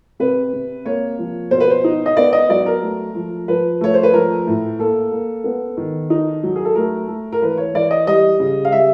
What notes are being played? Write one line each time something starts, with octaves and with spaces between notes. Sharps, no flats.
C3 B4
C3
A#3 C#5
F3
B2 C5
B4
C5
D#4
D#5
B3 D5
D#5
F#3 D5
A#4
A3
F3
F3 B4
A3 C#5
C5
B4
F3 A#4
A2
A#3 A4
A#3
B3
D#3
D#4
F#3
G#4
A4
A3 A#4
A3
A#4
E3 B4
C#5
E3 D5
D#5
G3 D#5
C#3
F5
G3 E5